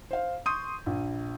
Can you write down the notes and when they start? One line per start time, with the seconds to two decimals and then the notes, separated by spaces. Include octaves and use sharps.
0.11 C5 F5
0.46 C6 C#6 D#6 G6 D#7
0.86 A#1